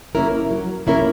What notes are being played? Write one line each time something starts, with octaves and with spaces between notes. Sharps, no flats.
A#3 C#4 E4 A#4
F#3
A#3 C#4 E4 A#4